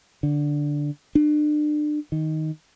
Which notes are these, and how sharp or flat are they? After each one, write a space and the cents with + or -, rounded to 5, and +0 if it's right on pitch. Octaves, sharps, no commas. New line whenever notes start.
D3 -5
D4 +35
D#3 +10